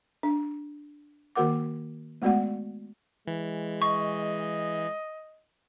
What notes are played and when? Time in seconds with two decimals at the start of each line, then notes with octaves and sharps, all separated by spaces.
0.23 D4
1.35 D#3 A#3 F#4 A#4 F#5 D6
2.22 G#3 A3 B3 F#4 D5 F#5
3.27 E3 G#3
3.82 D#5 C#6